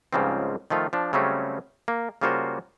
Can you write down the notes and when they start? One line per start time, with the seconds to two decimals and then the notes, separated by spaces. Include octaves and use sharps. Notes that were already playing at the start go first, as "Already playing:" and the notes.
0.13 C#2 G#2 C#3 F3 G3 C4
0.70 D#3 F3 A3 F4
0.93 F3 D4
1.13 C#3 F#3 G3 A3 C4 C#4
1.88 A#3
2.21 C#3 G3 A#3 F4 F#4 C5